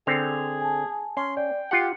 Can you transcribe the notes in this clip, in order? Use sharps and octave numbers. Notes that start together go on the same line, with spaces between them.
D3 C4 G#4 F7
G#5 A5
C#4 C6
D5 G5
F4 G4 F#5 C#7